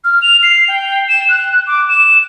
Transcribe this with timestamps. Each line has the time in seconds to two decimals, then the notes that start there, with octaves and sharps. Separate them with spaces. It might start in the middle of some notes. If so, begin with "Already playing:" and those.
0.04 F6
0.22 F7
0.43 C7
0.68 G5
1.09 E7
1.29 F#6
1.67 D6
1.89 E7